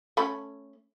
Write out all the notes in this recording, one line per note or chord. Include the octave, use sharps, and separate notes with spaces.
A3 C#4 B5